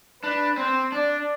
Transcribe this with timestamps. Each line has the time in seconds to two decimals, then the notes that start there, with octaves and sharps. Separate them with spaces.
0.23 D4 B4
0.58 C4 C5
0.92 D4 D5